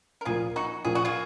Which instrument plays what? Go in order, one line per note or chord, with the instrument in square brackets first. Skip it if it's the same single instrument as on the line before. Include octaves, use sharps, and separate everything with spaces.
[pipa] A#4
[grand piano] A#2 F3 A#3 [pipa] F4 G#4
[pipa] D#4 F#4
[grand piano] A#2 F3 A#3 [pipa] G#4
[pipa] F#4
F4 G#4